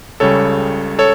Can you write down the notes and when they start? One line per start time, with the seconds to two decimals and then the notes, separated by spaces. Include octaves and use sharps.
0.20 C#2 C#3 G3 A4 C#5
0.99 A4 C#5